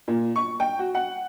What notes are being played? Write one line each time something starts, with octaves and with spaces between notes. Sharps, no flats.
A#2
C#6
G5
F#4
F#5